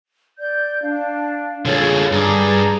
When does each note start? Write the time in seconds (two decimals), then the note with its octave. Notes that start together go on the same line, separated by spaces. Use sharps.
0.38 D5 G6
0.82 D4 F5
1.65 D3 F4 G#4 A4 C#5
2.12 G2 G#4 A#5 D6